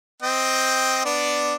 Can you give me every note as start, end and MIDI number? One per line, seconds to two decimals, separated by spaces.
0.22 1.03 60
0.22 1.03 75
0.22 1.03 79
1.05 1.55 59
1.05 1.55 62
1.05 1.55 74